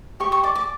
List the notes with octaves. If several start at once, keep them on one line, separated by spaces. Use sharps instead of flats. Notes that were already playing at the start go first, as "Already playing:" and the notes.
G4 C#6
C#6
D5 D6
D6